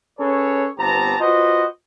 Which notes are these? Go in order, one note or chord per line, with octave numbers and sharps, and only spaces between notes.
C#4 G#4 A4 B4 C#5
G1 B3 C4 G4 A5 A#5
F4 F#4 B4 C5 D#5